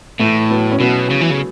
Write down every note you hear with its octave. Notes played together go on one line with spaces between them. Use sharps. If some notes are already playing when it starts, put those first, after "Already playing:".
A2 E3 A3
F#3 B3
C#4
B2 F#3 B3
C#3
E3
C#3